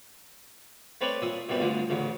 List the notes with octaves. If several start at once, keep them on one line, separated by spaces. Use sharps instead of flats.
A3 C4 B4 C#5 D5 G#5
A#2 E5 D#6
F#2 A#2 G3 B3 C4
D2 G2 D3 F3
A1 D2 C#3